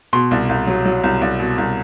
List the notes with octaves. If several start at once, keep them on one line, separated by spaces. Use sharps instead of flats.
B2 C6
C2
C2
F#3
F#3
C2
C2
B2
C2